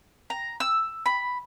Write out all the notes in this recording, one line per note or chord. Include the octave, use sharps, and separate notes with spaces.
A#5
E6
B5